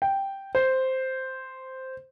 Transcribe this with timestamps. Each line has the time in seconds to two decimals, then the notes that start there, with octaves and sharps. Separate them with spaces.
0.02 G5
0.55 C5